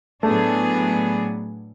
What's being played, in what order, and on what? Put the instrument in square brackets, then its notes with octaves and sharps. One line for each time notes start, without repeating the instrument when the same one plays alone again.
[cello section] A2 F#3 B3 D4 G#4 [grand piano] A3